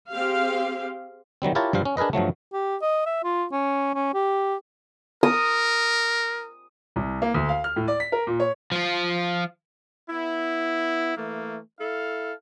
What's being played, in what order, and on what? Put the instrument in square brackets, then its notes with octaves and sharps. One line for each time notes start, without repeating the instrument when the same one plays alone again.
[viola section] C4 G4 G#4 F5
[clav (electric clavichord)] D#3 F#3 G3 C4
E4 F4 G4 A#4 C#5 A5
G2 F3 G3 C5 F5
C#4
D4 G#4 A#4 B4 D#5
G2 F3 F#3 A3
[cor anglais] G4
D#5
E5
F4
C#4
C#4
G4
[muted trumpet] A#4 [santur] D#6
[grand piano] C2
A#3
D2
F5
F6
A2
D5
B6
A#4
A#2
C#5
[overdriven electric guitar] F3 F4
[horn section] B3 E4
E3 A3 A#3
E4 A4 F5